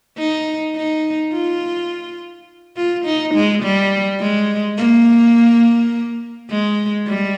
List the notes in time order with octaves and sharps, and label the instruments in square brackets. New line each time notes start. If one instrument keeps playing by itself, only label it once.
[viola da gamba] D#4
D#4
F4
F4
D#4
G#3
G3
G#3
A#3
G#3
G3